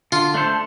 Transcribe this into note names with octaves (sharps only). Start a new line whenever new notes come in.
D3 F4
A3 D4 A4 C5